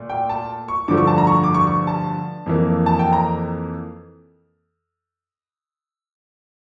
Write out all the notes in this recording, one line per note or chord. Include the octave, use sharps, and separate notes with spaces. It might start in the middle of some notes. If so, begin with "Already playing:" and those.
Already playing: A#2 A3
G5
A5
C#6
G2 D3 F3 A3 D6
C#6
A5
A#5
C#6
D6
C#6
C#6
A5
F2 E3 A#3
A5
G5
A#5